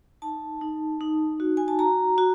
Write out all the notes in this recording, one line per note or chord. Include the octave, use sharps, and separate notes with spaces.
D#4 A5
D#4
D#4
F#4
G#5
A5
F#4 A#5
F#4